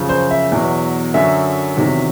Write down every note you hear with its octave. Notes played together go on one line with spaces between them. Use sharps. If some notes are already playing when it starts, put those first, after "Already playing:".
Already playing: F#2 C#3 F3
C5
E5
E2 B2 F#3
F#2 D3 F#3 E5
E2 C3 D#3 F#3